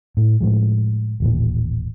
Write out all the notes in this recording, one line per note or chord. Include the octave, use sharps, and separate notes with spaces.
A2
A2 F3 G#3
D#1 A1 A#2